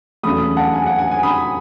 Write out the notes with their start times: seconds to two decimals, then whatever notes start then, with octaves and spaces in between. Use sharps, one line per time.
0.23 E2 C#3 F#3 A3 B5 D#6
0.57 F#5 A5
0.74 G#5
0.86 F#5
0.99 G#5
1.11 G#5
1.23 B5 D#6